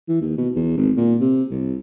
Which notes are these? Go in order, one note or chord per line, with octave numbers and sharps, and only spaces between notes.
E3
D#2
B2
E2
G#1
A#2
C3
C2